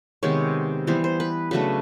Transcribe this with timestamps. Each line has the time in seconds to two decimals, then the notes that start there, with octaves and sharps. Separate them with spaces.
0.23 C3 D#3 G#3 B3 C#5
0.87 E3 G3 B3 C5
1.04 C5
1.20 B4
1.51 C#3 F#3 A3 D4 B4